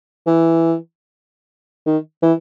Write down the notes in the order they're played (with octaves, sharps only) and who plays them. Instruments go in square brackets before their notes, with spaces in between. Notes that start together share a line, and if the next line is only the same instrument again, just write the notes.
[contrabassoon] E3
D#3
E3